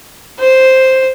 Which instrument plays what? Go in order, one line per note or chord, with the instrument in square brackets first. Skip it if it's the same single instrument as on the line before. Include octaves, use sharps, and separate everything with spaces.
[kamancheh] C5